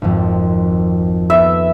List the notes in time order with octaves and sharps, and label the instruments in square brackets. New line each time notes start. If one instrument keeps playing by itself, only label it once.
[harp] G#1 F2
[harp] B3 A4 [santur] E5